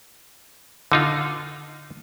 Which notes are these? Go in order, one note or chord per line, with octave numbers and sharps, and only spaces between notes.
D3 D#4 F4